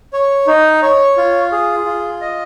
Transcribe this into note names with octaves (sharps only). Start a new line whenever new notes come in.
C#5
D#4
C#5
F4
G#4
F4
D#5